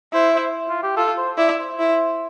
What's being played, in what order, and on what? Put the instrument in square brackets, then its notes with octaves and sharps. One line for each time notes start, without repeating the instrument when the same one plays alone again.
[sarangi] E4 [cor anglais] C5
[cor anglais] C5
F4
G4
[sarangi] F4 [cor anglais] A4
[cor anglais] C5
[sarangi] E4 [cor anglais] D5
[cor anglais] C5
[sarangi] E4